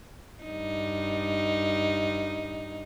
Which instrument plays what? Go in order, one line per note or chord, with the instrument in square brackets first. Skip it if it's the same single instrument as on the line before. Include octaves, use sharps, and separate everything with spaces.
[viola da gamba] G2 D#4